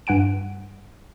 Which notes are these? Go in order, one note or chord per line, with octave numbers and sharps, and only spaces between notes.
G2 F#5 G#5 D7